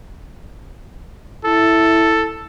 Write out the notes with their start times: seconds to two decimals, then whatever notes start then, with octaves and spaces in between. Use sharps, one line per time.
1.45 E4 A4